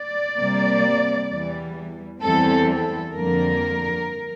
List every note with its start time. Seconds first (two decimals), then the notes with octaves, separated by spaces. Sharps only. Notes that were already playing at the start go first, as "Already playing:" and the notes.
Already playing: D5
0.37 C3 G3 A#3
1.29 E2 E3 G3
2.22 E2 E3 G3 C4 A4
2.68 A4
3.14 F2 D3 G3 A#3 A#4